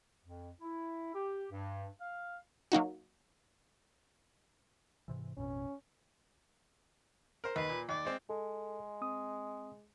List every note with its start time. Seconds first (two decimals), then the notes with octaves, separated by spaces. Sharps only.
0.23 F2
0.61 E4
1.13 G4
1.50 G2
2.00 F5
2.72 F#3 A#3 D#4 F#4
5.08 G#2 C3 E3
5.37 A1 F2 B2 C#4
7.44 A#4 C5
7.56 D#2 B4
7.69 A#2
7.89 D#2 D5
8.05 G#3 C4
8.30 G#3 A4
9.01 C4 D#6